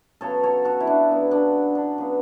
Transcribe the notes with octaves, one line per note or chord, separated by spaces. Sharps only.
C#3 F#3 B3 A4 C#5
A4 C#5
F#4 A4
E4
D4 F#4
C#3 F#3 B3
D4
D4
C#3 F#3 B3